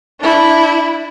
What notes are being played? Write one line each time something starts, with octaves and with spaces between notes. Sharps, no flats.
D4 E4